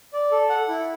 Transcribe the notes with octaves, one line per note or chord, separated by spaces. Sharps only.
D5
A4
F#5
E4